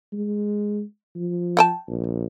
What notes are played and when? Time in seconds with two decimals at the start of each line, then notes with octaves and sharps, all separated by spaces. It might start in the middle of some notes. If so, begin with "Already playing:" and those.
0.12 G#3
1.15 F3
1.57 F#5 G5 A5
1.87 A#1